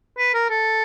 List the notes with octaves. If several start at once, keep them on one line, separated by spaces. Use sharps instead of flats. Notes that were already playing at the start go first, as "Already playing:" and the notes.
B4
A#4
A4